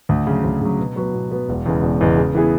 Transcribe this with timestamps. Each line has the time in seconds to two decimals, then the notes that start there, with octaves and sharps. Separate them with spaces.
0.09 D2
0.27 C#3 F#3
0.44 D2
0.61 C#3 F#3
0.79 B2
0.96 F#3 B3 F#4 B4
1.14 B2
1.31 F#3 B3 F#4 B4
1.49 E1
1.66 E2 C#3 G#3
1.83 E1
2.01 E2 C#3 G#3
2.18 C#3
2.35 E3 B3 E4 G#4